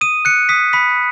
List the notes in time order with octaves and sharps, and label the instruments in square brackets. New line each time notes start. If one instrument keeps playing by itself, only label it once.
[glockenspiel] D#6 D#7
F#6 C#7
D#6 B6
B5 B6